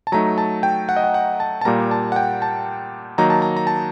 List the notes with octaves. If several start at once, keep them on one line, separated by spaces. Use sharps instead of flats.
A5
F#3 A3 D#4 A#5
A5
G5
F#5
D#5
F#5
F#5
A5
A5
A#2 G3 A#3 A#5
A5
F#5
G5
A5
D#3 F#3 A#3 D#4 A#5
A5
A#5
A#5
A5